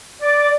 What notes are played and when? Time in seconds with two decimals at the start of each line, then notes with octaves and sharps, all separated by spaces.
0.20 D5